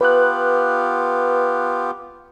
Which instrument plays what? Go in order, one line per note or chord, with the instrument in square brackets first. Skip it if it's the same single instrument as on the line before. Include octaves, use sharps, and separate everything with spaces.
[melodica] B3 F4 G4 [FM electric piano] B4 F#6